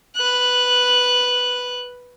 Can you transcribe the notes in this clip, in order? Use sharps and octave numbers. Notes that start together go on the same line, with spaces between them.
B4 F#6